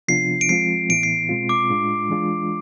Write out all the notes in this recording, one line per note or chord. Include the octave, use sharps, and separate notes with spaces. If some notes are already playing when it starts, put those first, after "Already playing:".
C3 F3 B3 D4 F4 C7
D7
F3 G#3 C4 F4 C7
A2 E3 B3 E4 D7
C7
B2 G#3 C4 F4
D6
A2 G#3 D4 F4
E3 G#3 D4 F4